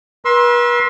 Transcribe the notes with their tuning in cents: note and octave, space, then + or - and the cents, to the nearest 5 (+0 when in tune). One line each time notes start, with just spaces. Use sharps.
B4 -40 C6 +20 E6 +0